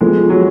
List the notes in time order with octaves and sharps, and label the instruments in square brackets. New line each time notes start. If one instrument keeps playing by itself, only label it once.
[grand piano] F3 B3 F4 A4 [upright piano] G#3
[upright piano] F#3